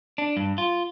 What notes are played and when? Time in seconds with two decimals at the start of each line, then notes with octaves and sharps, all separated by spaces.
0.18 D4
0.37 G2
0.58 F4